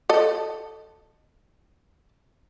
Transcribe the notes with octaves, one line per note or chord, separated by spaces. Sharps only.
A4 D#5